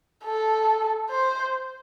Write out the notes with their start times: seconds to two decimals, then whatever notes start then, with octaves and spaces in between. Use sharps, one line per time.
0.24 A4
1.10 C5